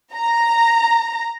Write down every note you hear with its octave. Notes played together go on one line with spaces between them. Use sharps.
A#5